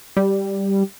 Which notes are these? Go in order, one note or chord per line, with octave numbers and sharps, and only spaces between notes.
G3